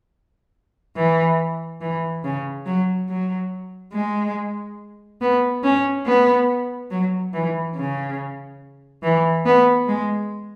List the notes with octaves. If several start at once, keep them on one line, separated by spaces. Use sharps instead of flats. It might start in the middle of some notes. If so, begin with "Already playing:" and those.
E3
E3
C#3
F#3
F#3
G#3
B3
C#4
B3
F#3
E3
C#3
E3
B3
G#3